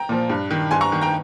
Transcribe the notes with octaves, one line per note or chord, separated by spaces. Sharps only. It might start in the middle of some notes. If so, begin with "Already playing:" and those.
Already playing: G5 A#5
A#2 F3
G2
D#3
G2 G#5 C6
A#5 C#6
D#3
G5 A#5